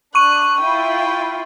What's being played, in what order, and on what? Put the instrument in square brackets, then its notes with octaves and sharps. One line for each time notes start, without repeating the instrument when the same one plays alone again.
[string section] D4 [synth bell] C#6 D#7 [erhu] F#6
[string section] E4 F4 [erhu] G5